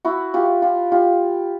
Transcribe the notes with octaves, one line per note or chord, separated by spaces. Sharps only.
E4 F#4
F4 G4
F4 G4
F4 G4